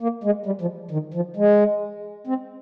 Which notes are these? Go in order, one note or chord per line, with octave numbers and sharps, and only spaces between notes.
A#3
G#3
G3
F3
D#3
F3
G#3
C4